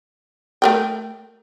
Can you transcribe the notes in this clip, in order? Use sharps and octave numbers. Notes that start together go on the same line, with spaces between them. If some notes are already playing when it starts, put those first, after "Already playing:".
A3 A#4 G5